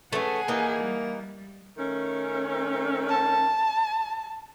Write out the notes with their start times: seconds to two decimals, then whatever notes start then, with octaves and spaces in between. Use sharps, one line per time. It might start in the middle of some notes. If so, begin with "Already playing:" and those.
0.13 A3 C#4 G#4 B4 F#5
0.48 E3 A#3 D#4
0.83 G3
1.77 D#3 A3 C#4
3.09 A5